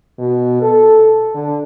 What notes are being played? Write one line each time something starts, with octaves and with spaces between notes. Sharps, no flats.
B2
A4
D3